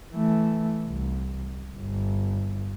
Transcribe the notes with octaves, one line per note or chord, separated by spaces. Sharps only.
E3 A3
C2
G1